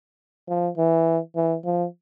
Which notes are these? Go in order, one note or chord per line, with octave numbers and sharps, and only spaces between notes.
F3
E3
E3
F3